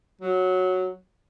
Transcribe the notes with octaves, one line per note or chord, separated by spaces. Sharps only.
F#3